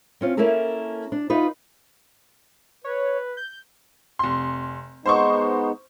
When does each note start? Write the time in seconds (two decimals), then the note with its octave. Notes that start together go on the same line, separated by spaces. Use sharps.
0.21 C4 C#4 F4
0.37 A#3 C#4 E4 A4 A#4 A5
1.12 D4
1.30 D#4 F4 B4
2.84 B4 C#5
3.37 G6
4.19 F1 C6
5.06 G#3 B3 D#4 C5 C6 C#6